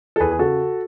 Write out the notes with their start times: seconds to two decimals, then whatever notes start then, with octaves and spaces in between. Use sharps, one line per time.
0.16 A4
0.20 E2 G#4 B4
0.31 G#4
0.39 C#3 F#4 A4